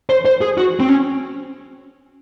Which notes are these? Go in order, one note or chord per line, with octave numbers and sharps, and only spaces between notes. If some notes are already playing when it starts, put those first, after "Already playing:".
C5
C5
G#4
F#4
C4
C#4